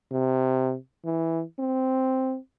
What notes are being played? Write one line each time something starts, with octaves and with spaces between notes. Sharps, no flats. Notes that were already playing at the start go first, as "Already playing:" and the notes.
C3
E3
C4